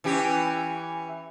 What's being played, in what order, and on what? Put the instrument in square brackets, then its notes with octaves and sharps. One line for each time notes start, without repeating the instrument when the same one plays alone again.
[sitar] E3 C#4 G4